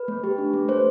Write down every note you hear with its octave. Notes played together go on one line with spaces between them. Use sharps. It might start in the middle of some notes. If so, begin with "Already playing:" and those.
Already playing: B4
A3
G4
D4
A3
A3 C5